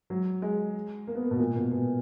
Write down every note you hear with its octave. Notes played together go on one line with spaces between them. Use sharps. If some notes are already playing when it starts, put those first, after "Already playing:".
F#3
G#3
A#3
B3
A#3
B2
A#2
B2
B2